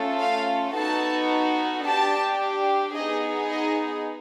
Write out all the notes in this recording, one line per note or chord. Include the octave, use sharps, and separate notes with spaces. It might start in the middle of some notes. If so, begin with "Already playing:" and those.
Already playing: A3 C#4 F4 A4
F5
B3 D#4 F#4 A4 A5
D4 G4 A5
B3 D#4 G#4 D#5
D#5